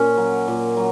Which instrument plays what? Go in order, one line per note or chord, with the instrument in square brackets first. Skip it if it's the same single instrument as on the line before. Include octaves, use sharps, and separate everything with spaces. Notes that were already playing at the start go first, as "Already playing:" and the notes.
Already playing: [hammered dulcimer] A#2 C#4
F#3
A#2
F#3